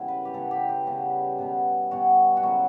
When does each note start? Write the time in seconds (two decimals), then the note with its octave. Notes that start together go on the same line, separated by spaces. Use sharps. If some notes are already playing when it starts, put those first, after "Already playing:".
Already playing: C#3 E3 G3 B3 E4
0.08 B4
0.25 G4
0.34 C#3 E3 B3 A4
0.51 G4
0.69 G4
0.87 C#3 G3 B3
1.39 B2 G3 B3
1.91 B2 G3 B3 F#4
2.37 F#4
2.43 C#3 F#3 B3 E4